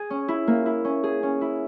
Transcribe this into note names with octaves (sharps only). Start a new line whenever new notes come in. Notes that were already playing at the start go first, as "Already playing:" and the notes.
Already playing: G#4
C#4
E4
A#3
E4
C#4
G#4
C#4
E4